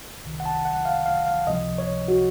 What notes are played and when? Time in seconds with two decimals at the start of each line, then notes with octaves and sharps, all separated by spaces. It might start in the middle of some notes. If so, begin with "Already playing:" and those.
0.24 C2 C3 D#3
0.40 F#5
0.46 A5
0.65 F#5
0.85 F5
1.06 F5
1.26 F5
1.47 C#2 C3 F3 D#5
1.78 C#5
2.08 F#4